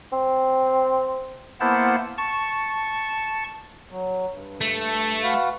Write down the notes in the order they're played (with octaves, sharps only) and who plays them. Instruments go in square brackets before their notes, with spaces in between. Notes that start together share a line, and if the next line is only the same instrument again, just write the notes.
[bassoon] C4
[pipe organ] A#3 B3 E4 C5 F#5 A5
A5 C#6
[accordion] F#3
G2
[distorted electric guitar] A3
[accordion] F#4 B4 F5